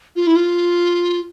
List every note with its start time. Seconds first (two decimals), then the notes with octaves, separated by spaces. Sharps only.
0.16 F4
0.27 E4
0.36 F4